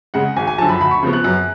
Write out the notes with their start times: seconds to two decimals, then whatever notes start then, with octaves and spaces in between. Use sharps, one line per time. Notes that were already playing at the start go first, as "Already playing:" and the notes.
0.14 C#3 G#3 F#5
0.36 G#1 G#5
0.47 G#5
0.58 F#2 D3 F3 A5
0.69 B5
0.81 D2 B5
0.91 C#6
1.03 C#3 F3 B3
1.13 F#6
1.24 F#2